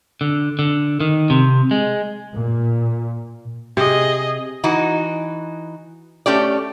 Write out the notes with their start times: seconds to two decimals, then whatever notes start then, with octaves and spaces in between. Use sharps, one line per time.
0.21 D3
0.59 D3
1.00 D#3
1.30 C3
1.71 G#3
2.35 A#2
3.77 C3 G#4 D#5
4.64 E3 D#4 F#4
6.26 A3 C#4 G4 D5